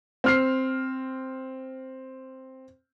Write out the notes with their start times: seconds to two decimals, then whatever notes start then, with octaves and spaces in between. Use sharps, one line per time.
0.24 C4 F6 C7